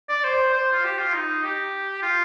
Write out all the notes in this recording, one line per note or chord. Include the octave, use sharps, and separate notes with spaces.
D5
C5
C5
F4
G4
F4
D#4
G4
F4